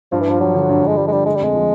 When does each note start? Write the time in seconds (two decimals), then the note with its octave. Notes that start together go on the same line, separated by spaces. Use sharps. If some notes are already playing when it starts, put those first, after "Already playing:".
0.12 G2 F3
0.21 E3
0.26 G2 F3
0.40 F3 F#3
0.54 D3
0.69 G2
0.83 G2 G#3
0.97 F3 G3
1.08 G#3
1.12 D3 G3
1.26 G#3 A3
1.35 G3
1.41 F2 G#3
1.55 F3